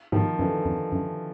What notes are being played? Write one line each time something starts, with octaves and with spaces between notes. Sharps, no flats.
G#2 D#3 F3
F#2 D3 E3
F2
F#2